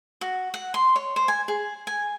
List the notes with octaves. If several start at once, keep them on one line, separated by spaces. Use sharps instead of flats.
F#4
F#5
C6
C#5
C5
G#5
G#4
G#5